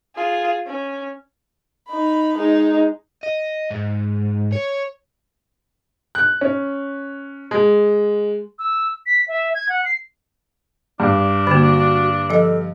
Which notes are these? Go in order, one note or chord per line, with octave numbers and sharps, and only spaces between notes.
F4 G#4
C#4
D#4 B5
G#3 D#4
D#5
G#2
C#5
F#6
C#4
G#3
E6
B6
E5
G#6
F#5
C7
G2 D4
D3 A#3 F#4
F3 A4 D#5